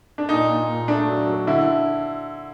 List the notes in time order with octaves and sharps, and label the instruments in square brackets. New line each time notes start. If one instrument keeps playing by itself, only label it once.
[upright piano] D4
A#2 D#4
A#2
A#2
A3 D4
F#3
F#3
D3 E4